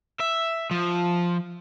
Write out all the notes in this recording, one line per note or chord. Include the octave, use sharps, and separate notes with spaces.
E5
F3